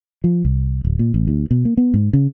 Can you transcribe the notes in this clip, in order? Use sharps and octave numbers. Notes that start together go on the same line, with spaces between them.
F3
C2
D1
A#2
A1
D2
B2
A#3
B3
G#2
C#3